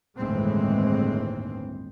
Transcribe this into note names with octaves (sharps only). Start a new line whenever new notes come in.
G1 D#2 A2 E3 G#3 C4